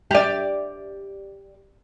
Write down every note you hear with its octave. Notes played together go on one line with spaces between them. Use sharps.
G4 D5